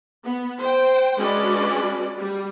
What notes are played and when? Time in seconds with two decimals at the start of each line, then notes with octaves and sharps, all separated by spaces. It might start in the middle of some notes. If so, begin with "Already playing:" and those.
0.25 B3
0.59 C5 G5
1.18 G#3 C#4 D4 F#4 B4 D5
2.18 G3